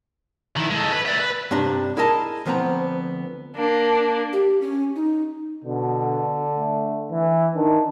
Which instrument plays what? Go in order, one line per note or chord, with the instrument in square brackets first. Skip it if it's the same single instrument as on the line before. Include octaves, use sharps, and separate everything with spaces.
[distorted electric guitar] D#3 E4
G#3 A3
B4
D5 E5
B4
[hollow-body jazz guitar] G2 C3 D4 A#5
E4 G#4 A#4 D#5 A5
D2 F3 B3 C4 A#5
[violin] A#3 D4
[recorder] G4
C#4
D#4
[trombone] B2 [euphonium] D3
[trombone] A3
E3
[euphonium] D#3 [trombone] D4